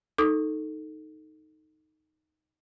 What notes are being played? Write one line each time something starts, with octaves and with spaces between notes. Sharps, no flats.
D#4 A4 D6 D#6